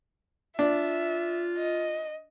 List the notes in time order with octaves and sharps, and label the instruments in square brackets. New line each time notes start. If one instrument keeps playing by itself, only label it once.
[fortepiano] D4 [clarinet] F4 [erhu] E5
[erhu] D#5